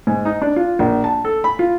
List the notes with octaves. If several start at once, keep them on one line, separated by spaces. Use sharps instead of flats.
G#2
D#4
D4
F4
A#1
A5
A4
B5
F4